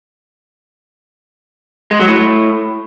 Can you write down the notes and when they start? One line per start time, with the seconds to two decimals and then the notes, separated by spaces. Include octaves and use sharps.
1.91 G#3
2.00 F#3
2.08 A2